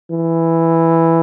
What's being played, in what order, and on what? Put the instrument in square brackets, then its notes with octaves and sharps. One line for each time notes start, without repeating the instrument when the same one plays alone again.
[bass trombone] E3